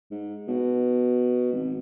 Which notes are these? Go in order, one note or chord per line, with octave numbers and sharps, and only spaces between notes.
G#2
B2
G#1